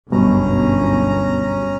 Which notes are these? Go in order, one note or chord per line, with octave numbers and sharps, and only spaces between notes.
G1 C#2 F#2 B2 G3 C#4 A#5